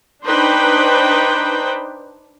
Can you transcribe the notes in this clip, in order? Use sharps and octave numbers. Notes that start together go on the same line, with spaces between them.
D4 D#4 B4 C5 G5